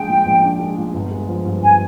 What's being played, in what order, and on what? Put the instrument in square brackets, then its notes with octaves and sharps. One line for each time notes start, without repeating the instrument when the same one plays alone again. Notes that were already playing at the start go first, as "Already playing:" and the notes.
Already playing: [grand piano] A#1 G#3 D4 [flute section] G5
[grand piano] A#2
A#1
D4
G#3
A#2
G1
G#3
F3
G2
[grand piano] G1 [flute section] G#5